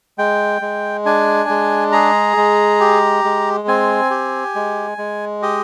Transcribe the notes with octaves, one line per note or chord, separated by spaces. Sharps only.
G#3 G5
G#3
D4 G#5
G#3
G#4 A#5
G#3
G4
G#3
C4 G#5
G4
G#3
G#3
G4 D#5